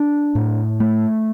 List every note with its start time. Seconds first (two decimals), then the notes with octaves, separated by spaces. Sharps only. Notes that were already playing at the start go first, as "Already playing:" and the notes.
Already playing: D4
0.35 A2
0.80 A3